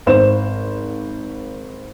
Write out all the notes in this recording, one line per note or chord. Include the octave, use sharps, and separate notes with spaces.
G#1 C5 E7